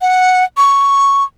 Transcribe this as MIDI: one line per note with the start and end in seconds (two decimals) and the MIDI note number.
0.01 0.44 78
0.57 1.24 85